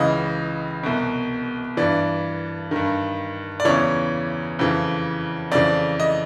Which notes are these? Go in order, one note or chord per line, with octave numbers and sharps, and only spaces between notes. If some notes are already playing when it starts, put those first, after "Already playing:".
Already playing: C#2 C#3 E3 D#5
C2 B2
G2 E3 D5
G2 D#3
D5
E2 C#3 E3 C#5
F2 C#3 E3
F2 C#3 E3 D5
D#5